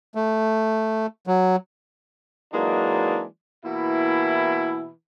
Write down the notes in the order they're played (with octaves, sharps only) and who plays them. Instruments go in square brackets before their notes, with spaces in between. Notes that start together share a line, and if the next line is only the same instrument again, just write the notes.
[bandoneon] A3
F#3
[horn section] E3 F#3 G#3 A#3 D4 D#4
B2 E3 A#3 E4